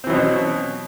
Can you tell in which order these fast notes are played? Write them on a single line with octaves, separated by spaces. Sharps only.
C4 E3 F#3 B2 C#4